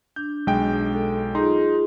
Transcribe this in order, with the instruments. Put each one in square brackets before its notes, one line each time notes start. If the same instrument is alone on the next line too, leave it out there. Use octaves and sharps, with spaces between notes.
[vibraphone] D4 [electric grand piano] G6
[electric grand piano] B1 G#3 G5
[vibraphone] A4
[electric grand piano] D#4 C6 [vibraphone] F4 G#4